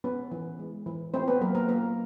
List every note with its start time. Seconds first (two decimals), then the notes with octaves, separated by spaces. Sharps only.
0.04 B3 C#4 B4
0.32 E3
0.59 G#3
0.86 E3
1.14 A3 C4 C5
1.28 B3 B4
1.41 F#3 A#3 A#4
1.55 A#3 A#4
1.69 A#3 C#4 A#4